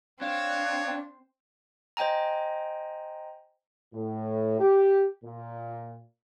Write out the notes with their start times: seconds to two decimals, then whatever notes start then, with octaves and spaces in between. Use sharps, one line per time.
0.22 C4 D4 C#5 F5
1.97 C5 D#5 G5 G#5 A#5
3.93 A2
4.59 G4
5.23 A#2